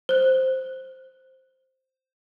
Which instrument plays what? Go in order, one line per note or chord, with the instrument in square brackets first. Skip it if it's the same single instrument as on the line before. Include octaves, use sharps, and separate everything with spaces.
[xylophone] C5 F#6